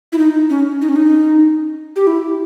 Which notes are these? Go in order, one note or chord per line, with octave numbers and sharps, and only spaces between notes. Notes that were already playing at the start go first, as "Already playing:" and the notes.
E4
D#4
C#4
D#4
C#4
D#4
G4
E4